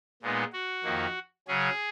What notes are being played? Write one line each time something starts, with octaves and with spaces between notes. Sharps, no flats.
A#2 G#3 B3 D#4
F#4
F2 D#3 A#3 D#4
C#3 F#3 C#4 G#4